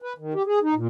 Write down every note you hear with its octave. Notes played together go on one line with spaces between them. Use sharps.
B4
D#3
G4
G#4
D#4
A#2